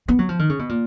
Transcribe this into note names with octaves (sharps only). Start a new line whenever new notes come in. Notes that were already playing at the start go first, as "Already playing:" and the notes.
B3
F#3
F3
D#3
C#3
B2
A#2